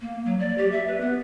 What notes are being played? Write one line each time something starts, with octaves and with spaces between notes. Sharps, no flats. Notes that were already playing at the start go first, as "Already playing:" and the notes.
A#3
F#3
D5
G4
E5
B4
B3